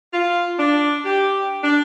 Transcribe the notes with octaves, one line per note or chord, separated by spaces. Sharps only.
F4
D4
G4
D4